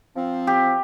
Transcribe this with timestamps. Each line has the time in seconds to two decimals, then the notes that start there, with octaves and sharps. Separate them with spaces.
0.16 F3 C4
0.47 G4